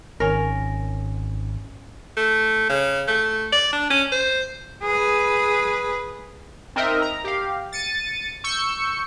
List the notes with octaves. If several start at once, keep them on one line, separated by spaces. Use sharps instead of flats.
G#1 C#4 A#4
A3
C#3
A3
D5
D4
C#4
C5
G#4 B4
C4 D#4 A#4 D#5 E5
A#5
G4 F5
A6 C#7 D#7
C#6 E6 G6 C#7